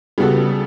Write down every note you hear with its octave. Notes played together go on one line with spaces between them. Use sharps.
C#3 G3 B3 F#4 A4